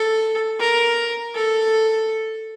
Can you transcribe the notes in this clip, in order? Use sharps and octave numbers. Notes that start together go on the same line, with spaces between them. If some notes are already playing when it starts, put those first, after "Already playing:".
Already playing: A4
A#4
A4